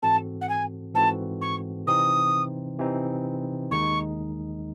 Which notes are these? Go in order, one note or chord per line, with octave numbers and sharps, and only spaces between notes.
G#2 E3 C4 F#4 A4 A5
F#5
G#5
G#2 E3 C4 F#4 A4 A5
C#6
C3 E3 C4 D#4 D#6
C3 E3 C4 D#4
D#2 D#3 G#3 D#4 C#6